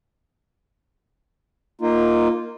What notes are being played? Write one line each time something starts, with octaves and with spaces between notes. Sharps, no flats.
A#3 D#4 F4